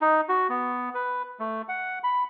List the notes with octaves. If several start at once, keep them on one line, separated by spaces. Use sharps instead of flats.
D#4
F#4
B3
B4
A3
F#5
B5